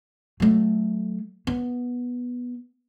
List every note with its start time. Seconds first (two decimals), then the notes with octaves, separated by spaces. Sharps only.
0.40 F#3 A3
1.47 B3